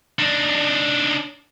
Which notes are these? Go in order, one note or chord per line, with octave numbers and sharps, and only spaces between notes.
D4 D#4